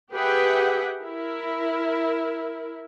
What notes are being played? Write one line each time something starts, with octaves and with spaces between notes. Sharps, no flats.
G4 G#4 B4 E5 F#5 G5
E4 A#4